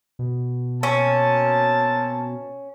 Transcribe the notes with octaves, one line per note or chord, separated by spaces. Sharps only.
B2
A#3 C4 C#4 A5